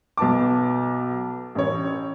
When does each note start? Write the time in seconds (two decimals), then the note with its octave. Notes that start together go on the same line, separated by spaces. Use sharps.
0.17 B1 B3 A5 D6
1.55 A1 C#5